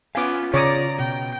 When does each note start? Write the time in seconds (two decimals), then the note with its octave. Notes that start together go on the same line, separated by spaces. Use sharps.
0.15 B3 C#4 F4 F5 G#5 D6
0.54 C#3 C#5 D5 A#5 D6 D#6
0.99 B2 G5